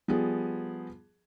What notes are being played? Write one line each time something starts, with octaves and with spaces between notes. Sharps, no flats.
F3 G3 B3 G#4